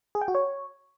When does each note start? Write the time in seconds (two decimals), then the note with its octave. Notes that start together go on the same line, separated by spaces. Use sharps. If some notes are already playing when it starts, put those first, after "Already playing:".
0.15 G#4
0.22 G5
0.28 F#4
0.35 C#5